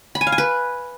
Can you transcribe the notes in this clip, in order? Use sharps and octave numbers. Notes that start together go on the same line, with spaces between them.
B5
G#5
F5
G#5
B4